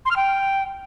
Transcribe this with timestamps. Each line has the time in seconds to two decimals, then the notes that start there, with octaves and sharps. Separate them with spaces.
0.05 C6
0.11 F6
0.16 G5